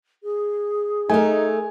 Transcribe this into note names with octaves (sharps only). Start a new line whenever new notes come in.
G#4
A3 D#4 A#4 G#5